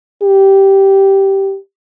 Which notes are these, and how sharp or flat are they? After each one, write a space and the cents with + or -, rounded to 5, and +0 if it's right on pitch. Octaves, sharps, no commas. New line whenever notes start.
G4 -10